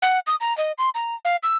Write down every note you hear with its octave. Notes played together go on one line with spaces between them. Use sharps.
F#5
D#6
A#5
D#5
C6
A#5
F5
E6